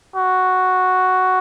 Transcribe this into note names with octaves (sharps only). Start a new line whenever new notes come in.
F#4